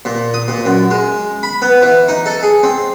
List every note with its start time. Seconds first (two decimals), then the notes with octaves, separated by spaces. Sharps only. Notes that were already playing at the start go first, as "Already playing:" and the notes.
0.05 A#2
0.34 D#6
0.48 A#2
0.65 F#2
0.91 G#3
1.43 B5
1.62 B3
1.82 E3
2.08 D#4
2.26 A4
2.43 G#4
2.63 C4